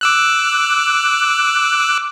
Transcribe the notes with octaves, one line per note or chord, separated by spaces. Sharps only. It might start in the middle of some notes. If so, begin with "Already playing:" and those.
D6 E6 F#6